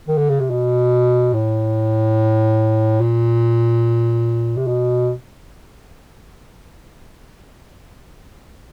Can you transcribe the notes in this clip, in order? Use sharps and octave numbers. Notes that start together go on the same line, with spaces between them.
D#3
D3
C#3
C3
B2
A2
A#2
C3
B2